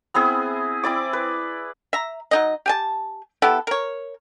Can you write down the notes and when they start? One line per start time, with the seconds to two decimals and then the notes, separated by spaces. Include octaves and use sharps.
0.14 B3 C4 E4 G#4
0.84 C4 E4 D5 D6
1.13 B4
1.93 E5 A#5
2.31 F#3 D#4 D#5
2.66 G4 G#5 A5
3.42 B3 E4 G4 A4
3.67 A#4 C#5